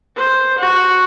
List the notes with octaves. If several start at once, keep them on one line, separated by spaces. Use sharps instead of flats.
C5
F#4